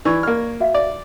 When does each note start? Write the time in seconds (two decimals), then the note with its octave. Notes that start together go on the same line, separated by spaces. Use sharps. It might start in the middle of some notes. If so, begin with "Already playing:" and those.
0.05 E3 D5 C#6 G#6
0.23 A#3 F6
0.60 F#4 E5 F5
0.74 D5